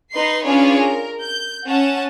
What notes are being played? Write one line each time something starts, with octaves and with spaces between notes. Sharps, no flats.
D#4 B4 C6 C7
C#4 D4 F4 G#4 B4 C#5
A#4
G6
C#4 F#5 A5